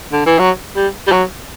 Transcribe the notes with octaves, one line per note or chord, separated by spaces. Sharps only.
D3
E3
F#3
G3
G3
F#3